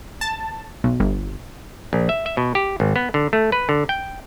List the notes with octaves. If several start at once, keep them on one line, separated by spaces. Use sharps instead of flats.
A5
B1
G1
A#1
E5
E5
B2
G4
G#1
B3
D3
A3
B4
D3
G5